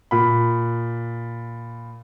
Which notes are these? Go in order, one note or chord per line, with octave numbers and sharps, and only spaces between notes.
A#2 B5